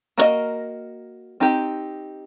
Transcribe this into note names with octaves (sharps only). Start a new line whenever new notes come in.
A#3 D4 F#4 A#4 D#5
C4 D#4 G4